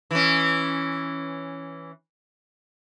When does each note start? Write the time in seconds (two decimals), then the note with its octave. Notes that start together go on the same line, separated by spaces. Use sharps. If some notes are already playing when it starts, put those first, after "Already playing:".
0.11 E3 C#4